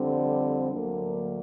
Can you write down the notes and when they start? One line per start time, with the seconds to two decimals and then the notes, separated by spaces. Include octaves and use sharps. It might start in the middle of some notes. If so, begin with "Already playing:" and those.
Already playing: F2 D3 G3 C4
0.71 D2 D3 F#3 A#3